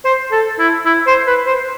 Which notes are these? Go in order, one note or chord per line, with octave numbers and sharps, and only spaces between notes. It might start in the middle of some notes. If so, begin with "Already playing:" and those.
C5
A4
E4
E4
C5
B4
C5